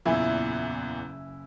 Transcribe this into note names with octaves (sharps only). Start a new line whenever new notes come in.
F#1 E2 A#2 E3 E4 G#5